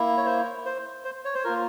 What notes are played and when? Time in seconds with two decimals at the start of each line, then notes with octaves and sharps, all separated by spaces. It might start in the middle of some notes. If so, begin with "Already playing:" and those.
Already playing: A#3 E4
0.17 C#5
0.26 C5
0.66 C5
1.05 C5
1.25 C#5
1.35 C5
1.44 A#3 F4 A#4